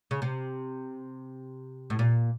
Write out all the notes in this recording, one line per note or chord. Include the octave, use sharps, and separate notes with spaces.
C#3
C3
A2
A#2